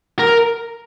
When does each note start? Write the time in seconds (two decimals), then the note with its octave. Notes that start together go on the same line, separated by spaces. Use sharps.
0.19 A#4